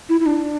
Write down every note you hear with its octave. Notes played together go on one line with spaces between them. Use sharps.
E4
E4
D4